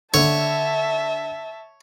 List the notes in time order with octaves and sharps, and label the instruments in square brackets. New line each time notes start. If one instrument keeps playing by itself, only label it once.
[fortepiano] D3 [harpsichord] C#5 [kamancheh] E5 A5